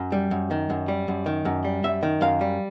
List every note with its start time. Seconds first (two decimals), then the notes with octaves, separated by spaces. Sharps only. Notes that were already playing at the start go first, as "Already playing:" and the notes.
Already playing: F#2
0.12 G3
0.31 F#2
0.51 D#3
0.70 F#2
0.88 G3
1.08 F#2
1.26 D#3
1.45 F#2
1.65 G3
1.83 F#2 E5
2.03 D#3
2.21 F#2 F5
2.41 G3